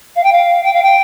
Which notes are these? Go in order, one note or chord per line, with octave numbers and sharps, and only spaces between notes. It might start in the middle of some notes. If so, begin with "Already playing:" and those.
F5
G5
F5
G5
F5
G5